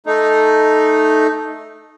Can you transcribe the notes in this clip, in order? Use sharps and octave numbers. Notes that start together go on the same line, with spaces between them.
A3 D#4